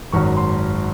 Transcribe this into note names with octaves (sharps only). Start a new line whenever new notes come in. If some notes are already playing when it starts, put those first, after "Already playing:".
G#1 F#2 D#3 F#3 C#6
C6